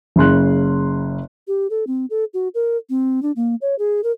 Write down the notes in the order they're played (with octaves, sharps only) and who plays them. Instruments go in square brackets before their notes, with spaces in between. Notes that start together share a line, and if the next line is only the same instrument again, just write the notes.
[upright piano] F#1 C#3 C6 F#6
[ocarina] G4
A4
C4
A4
F#4
A#4
C4
D4
A#3
C#5
G#4
A#4